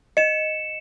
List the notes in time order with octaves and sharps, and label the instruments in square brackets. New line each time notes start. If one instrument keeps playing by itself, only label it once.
[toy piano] D#5 [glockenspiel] C#7 E7